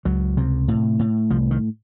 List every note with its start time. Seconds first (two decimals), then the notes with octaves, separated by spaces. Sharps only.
0.05 C#2 F#3
0.37 C3
0.68 A2
0.99 A2
1.30 C2 F3
1.51 D#3